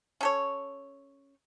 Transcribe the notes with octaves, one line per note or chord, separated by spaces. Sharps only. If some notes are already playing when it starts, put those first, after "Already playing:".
C#4 A4 C#5